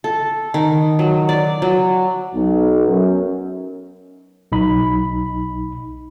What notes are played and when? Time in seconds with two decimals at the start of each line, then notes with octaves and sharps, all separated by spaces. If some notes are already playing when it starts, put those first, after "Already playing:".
0.04 A4
0.54 D#3
0.99 F#3
1.29 D5
1.62 F#3
2.34 B1
2.87 F#2
4.52 B1 D#4 B5